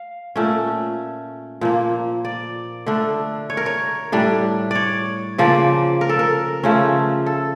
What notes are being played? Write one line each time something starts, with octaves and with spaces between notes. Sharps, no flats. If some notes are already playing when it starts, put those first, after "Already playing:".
Already playing: F5
A#2 A3 C#4
A#2 F3 A#3
D5
D3 A3 D4
C#5
A#4
C#5
A2 G3 D4
C#5 D5
C#3 F3 A#3 D5
A#4
A4
A#4
C#3 F3 A3 C#4
A4